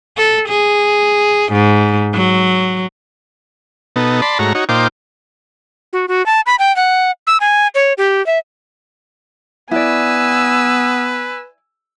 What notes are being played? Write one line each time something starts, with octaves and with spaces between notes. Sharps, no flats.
A4
G#4
G#2
F#3
B2 B3 D#4 A4
D5 A5 B5 C6
G#2 A3 F#4 C#5 A#5
D#4 F#4 C#5
A#2 D#4 F4 C5 G5 D6
F#4
F#4
A5
B5
G5
F#5
E6
G#5
C#5
G4
E5
B3 E4 B4 D5 G#5 E6